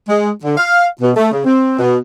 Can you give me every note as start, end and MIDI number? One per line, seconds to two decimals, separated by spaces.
0.08 0.30 56
0.43 0.56 50
0.57 0.86 77
1.01 1.11 47
1.16 1.29 57
1.32 1.42 49
1.45 1.77 60
1.78 1.97 47